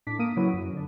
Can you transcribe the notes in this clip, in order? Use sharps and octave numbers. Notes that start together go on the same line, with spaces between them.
A2 D4 D6 B6
A#3 D#6 D7 D#7
C#3 F#3 A#3 E4 F#4 B4
F#2
D3 D4